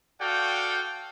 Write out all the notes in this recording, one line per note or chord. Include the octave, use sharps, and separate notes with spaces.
F#4 A4 D5 F5 G5